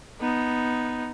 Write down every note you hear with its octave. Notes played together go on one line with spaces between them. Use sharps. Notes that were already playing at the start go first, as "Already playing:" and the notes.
B3 D#4